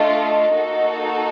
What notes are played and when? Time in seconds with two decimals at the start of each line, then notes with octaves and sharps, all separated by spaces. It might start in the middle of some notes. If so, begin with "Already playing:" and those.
Already playing: A3 D4 F4 A4 D#5
0.54 A#3 D#4 F#4 A4